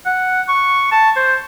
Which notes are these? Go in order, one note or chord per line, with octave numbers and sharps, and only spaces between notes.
F#5
C#6
A5
C5